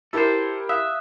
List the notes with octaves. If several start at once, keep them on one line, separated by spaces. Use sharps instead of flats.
E4 G4 A4 A#4 C5
E5 F5 D#6 F#6